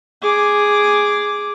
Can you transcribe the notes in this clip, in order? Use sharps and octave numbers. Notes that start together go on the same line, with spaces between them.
G#4 D6